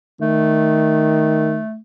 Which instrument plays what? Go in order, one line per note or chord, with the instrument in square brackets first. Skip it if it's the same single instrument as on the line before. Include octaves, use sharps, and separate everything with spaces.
[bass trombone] D#3 [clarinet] A3